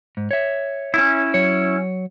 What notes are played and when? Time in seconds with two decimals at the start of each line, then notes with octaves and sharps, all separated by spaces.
0.17 G#2
0.31 C#5 E5
0.94 C#4 E4
1.34 F#3 C#5